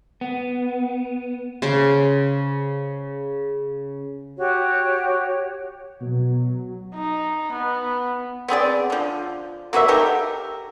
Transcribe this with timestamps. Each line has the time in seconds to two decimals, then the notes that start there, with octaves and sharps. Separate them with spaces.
0.21 B3
1.62 C#3 C5 D6
4.38 F#4 G4 C#5
6.01 B2 F#3
6.95 D#4
7.53 B3
8.48 B3 C4 G#4 D5
8.90 D3 F3
9.73 A#3 F#4 B4 E5
9.88 D#4 G4 A4 A#4